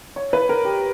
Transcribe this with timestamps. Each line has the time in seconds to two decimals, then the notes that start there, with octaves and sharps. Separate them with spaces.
0.16 C#5
0.33 B4
0.49 A#4
0.65 G4